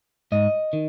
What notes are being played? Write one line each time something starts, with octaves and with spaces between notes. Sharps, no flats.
G#2 D#5
D#3